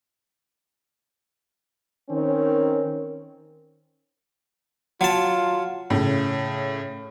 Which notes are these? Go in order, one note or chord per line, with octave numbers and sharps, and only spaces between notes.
D#3 C4 C#4 A#4 C#5
F#3 F4 A5
A2 C#3